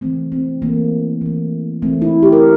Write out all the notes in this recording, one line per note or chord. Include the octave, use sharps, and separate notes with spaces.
E3 A3 C4
C4
E3 A3 A#3
E3 A3
E3 A3 C4
E4
G4
A#4